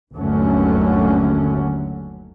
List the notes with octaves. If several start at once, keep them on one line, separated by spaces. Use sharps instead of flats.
G1 D#2 D3 F#3 A3 C#4